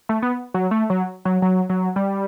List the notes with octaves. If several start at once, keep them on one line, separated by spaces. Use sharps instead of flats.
A3
B3
F#3
A3
F#3
F#3
F#3
F#3
G3